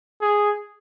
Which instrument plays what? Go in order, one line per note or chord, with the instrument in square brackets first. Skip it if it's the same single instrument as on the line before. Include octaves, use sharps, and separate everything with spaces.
[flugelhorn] G#4